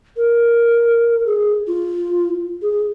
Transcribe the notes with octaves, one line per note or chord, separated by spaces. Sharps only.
A#4
G#4
F4
G#4